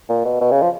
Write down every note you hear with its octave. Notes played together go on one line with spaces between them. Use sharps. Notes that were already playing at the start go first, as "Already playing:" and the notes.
A#2
B2
B2
C#3
F3